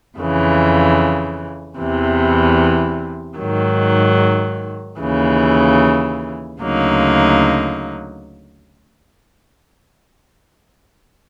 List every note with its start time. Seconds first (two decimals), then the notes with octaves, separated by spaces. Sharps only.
0.17 F2 C#3 E3
1.78 E2 C3 E3
3.39 G#2 D#3 F#3
5.00 D#2 C#3 E3
6.61 D2 C#3 F#3 A#3 D#4